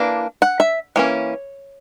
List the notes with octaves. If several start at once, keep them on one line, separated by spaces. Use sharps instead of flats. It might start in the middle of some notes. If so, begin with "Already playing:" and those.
Already playing: E3 A#3 D4
F#5
E5
E3 A#3 C#4 C#5